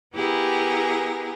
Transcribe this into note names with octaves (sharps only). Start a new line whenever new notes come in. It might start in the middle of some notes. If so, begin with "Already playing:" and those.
B3 E4 G4 G#4 A#4